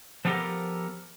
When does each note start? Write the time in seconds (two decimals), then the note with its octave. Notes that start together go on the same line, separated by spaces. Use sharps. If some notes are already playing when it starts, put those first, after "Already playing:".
0.25 F3 A3 B3 G4 A4 A#4